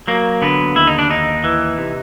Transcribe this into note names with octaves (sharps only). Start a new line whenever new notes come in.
F#3 A#3
D3 B3
D#2 E4
D#4
D4
D#2 D#4
E3
C3